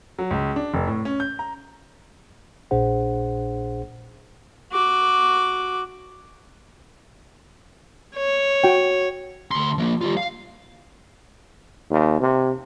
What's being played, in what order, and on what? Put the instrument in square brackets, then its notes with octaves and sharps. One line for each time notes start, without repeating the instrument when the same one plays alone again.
[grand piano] F#3
C#2
D4
F1
A2
C#4
G6
A#5
[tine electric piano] A#1 A#2 D4 G#4 C5 F#5
[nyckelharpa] F#4 D6
C#5
[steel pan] F#4 G5
[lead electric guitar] D2 C6
F3 A#3
G3 F4
F5
[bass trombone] D#2
C3